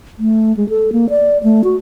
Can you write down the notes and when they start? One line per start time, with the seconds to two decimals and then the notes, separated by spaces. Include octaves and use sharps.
0.19 A3
0.57 G#3
0.69 A4
0.92 A#3
1.10 D5
1.43 A3
1.64 F#4